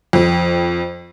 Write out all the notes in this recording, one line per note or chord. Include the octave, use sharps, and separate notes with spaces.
F2